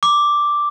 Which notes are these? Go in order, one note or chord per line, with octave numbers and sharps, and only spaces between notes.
D6